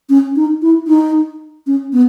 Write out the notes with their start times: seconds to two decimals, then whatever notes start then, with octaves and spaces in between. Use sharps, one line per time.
0.10 C#4
0.36 D#4
0.62 E4
0.88 D#4
1.67 C#4
1.93 B3